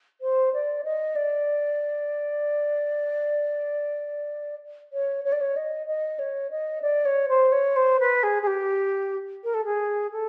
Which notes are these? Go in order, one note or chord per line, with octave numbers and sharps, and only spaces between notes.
C5
D5
D#5
D5
C#5
C#5
D5
C#5
D#5
D#5
C#5
D#5
D5
C#5
C5
C#5
C5
B4
G#4
G#4
G4
A#4
A4
G#4
A4